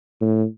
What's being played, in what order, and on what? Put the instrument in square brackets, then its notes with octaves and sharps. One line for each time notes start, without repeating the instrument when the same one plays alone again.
[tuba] A2